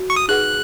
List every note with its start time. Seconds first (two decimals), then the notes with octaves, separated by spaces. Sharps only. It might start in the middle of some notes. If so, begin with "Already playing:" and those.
Already playing: F#4
0.10 C#6
0.16 D#6
0.28 D#4 G#4 B4 F#5 F#6